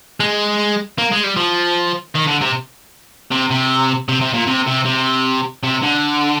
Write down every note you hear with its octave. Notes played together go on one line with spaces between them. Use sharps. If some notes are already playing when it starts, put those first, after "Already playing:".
G#3
A#3
G#3
G3
F3
D#3
D3
C3
C3
C3
C3
C3
A#2
C3
C3
C3
C3
D3